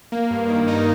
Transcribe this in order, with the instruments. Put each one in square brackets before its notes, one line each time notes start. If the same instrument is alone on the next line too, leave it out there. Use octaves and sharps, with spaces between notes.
[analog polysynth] A#3
G2
D#3
D#4